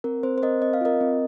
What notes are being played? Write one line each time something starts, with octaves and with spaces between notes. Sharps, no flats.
C4 A#4
C4 C5
C5
C4 A#4 D#5
C4 D#5
F5
F4 A#4 D#5
C4